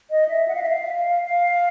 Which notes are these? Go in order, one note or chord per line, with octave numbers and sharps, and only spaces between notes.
D#5
E5
F#5
F5
E5
F5
F5